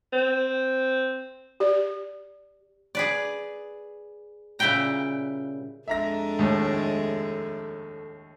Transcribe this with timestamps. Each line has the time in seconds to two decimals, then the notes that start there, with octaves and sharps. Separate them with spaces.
0.13 C4
1.60 G4 D5
2.95 G#4 B4 D5
4.59 A#2 C#3 G3 E4 G5 A#5
5.88 F2 G#3 D4 A4 E5 A#5 A#6
6.39 D#2 A2